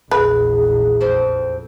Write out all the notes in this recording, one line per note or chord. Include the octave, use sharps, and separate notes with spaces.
A#1 E2 G#4 B4
F2 C4 C5